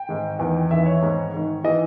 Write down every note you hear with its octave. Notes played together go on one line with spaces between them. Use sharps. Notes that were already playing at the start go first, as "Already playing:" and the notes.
Already playing: G5
G#2 D#3
E2 D#3
E2 D#3 E5
C#5
G#2 D#3
G#2 D#3
E3 D#5